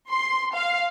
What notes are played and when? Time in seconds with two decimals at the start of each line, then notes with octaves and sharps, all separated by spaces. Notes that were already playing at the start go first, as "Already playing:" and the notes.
0.11 C6
0.54 F5